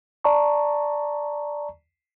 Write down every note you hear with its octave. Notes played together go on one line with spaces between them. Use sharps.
D5 A5 A#5 C#6